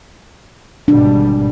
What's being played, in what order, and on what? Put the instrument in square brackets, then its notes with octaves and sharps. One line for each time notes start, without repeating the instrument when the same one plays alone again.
[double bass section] G#1 B2 G3 [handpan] D4